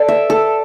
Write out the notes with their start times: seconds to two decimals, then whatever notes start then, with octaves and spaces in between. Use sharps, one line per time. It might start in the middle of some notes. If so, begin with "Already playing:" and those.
Already playing: A4 D5
0.08 E5
0.30 A4